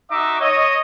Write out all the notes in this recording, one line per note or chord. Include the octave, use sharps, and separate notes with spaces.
D#4 F#4 E5 D6
C#5 D#5